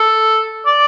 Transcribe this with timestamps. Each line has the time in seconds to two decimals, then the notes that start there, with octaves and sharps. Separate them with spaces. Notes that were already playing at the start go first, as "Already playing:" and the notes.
Already playing: A4
0.66 D5